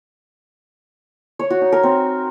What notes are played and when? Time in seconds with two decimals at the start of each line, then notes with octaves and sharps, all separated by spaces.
1.39 C#5
1.50 F#4
1.61 D#4
1.72 A#4
1.83 C4